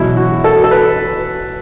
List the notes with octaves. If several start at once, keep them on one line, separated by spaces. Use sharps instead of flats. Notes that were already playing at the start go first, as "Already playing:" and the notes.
Already playing: E2 B2 F#3 E4
F#4
A4
A4
B4